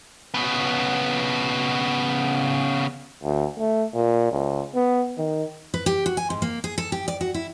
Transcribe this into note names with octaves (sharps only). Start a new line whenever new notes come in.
C#3 B3
D2
A3
A#2
C#2
B3
D#3
B4
G4
F#4
G#5
G#2
A#3
G#4
A4
G4
D5
F#4
E4